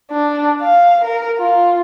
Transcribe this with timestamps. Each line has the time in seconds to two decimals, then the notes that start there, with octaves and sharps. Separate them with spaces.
0.11 D4
0.62 F5
1.04 A#4
1.39 F4